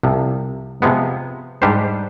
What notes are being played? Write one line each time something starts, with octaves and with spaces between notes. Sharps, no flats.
C2 C3 F3
C3 F3 G#3 B3
G#2 G3 D4 G4 C5